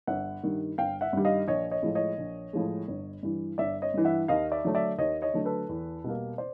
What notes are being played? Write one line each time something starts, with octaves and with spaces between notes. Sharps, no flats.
G1 E5 F#5
G2 D#3 G3
G1 F5 G5
E5 F#5
G2 D#3 G3
D#5 F5
A#1 C#5 D#5
C#5 D#5
A2 F3 G#3
C#5 D#5
A#1
A2 F3 G#3
G1
G2 E3
G1 D5 E5
C#5 D#5
G2 E3
E5 F#5
D#2 D#5 F5
D5 E5
D3 F#3 A3
D5 E5
D#2 C#5 D#5
C#5 D#5
D3 F#3 A3
A4 B4
E2
B2 G3 A#3
C5 D5